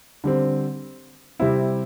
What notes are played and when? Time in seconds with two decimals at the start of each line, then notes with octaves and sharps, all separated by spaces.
0.24 D3 G3 C4
1.40 C3 G3 C4 E4